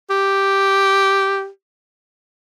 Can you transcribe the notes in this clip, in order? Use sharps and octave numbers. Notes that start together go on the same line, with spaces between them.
G4